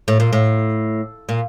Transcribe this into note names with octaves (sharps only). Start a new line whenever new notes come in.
A2
A#2
A2
A#2